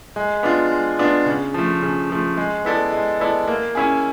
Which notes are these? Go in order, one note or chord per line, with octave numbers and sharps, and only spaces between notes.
G#3
B3 D4 F4
G#3
B3 D4 F4
C#3
F3 A3
C#3
F3 A3
G#3
B3 E4 A4 D5
G#3
B3 E4 A4 D5
A#3
C#4 E4 G#4